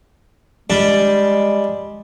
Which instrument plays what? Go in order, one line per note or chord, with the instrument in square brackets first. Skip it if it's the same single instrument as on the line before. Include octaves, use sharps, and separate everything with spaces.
[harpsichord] G3 D4 [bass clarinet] G#3